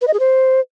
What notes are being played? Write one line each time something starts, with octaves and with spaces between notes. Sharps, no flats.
B4
D#5
G#4
C5